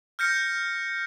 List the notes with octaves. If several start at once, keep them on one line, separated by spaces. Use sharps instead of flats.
F6 G6 A#6 C#7